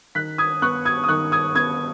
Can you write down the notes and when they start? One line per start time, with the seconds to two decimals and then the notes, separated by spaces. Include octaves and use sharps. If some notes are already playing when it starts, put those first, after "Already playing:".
0.15 D#3 F#6 B6
0.38 D#6 G#6
0.62 B3 C#6 F#6
0.85 D#6 G#6
1.04 D#6
1.08 D#3 C#6 F#6
1.32 D#6 G#6
1.55 B3 D#6 G#6